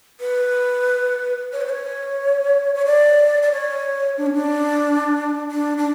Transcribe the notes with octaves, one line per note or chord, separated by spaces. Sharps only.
B4
C#5
B4
C#5
C#5
D5
D5
C#5
D4
C#4
D4
D4
D4